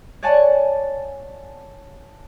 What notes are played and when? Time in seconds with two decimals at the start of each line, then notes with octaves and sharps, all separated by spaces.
0.22 C#5 D5 F#5 G#5 A5